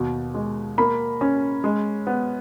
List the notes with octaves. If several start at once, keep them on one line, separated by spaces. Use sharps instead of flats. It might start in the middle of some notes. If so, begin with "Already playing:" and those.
Already playing: D#2 B2
G#3
A#3 B5
C#4
G#3
B3